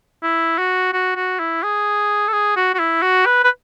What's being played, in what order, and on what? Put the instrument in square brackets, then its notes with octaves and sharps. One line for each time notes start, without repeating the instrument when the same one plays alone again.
[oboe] E4
F#4
F#4
F#4
E4
G#4
A4
G#4
F#4
F#4
E4
F#4
B4
B4